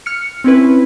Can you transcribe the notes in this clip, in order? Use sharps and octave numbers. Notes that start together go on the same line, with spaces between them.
F6 C#7
C4 C#4 E4 B4